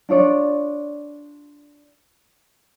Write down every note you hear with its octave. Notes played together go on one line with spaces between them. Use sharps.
D4 F4 C#5 D5